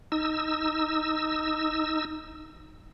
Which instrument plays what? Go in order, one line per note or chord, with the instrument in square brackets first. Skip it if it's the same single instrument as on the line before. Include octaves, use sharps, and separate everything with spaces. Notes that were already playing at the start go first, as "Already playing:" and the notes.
[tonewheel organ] D#4 E6